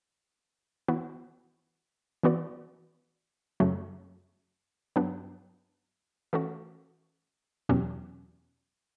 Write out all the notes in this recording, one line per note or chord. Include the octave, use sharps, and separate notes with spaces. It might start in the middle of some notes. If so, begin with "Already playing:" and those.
E3 B3 F#4 B4
E3 B3 F#4 B4 D5
F#2 C#3 F#3 A3
G2 F#3 B3 D4
E3 A3 C#4 F#4
E2 B2 F#3 C#4 G4